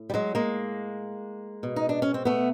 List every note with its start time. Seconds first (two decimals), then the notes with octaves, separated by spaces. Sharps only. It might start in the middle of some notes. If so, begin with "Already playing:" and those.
Already playing: A2
0.10 G3
0.14 F#3 G#3
0.35 G#3 A#3
1.63 B2
1.76 D#4
1.89 D4
2.02 C#4
2.14 C4
2.25 A3 B3